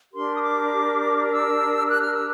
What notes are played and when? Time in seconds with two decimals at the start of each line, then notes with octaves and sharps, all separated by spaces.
0.13 D4 G4 A#4 C6
0.36 D#6
0.42 D6
1.31 E6
1.89 F#6
2.01 F6
2.14 E6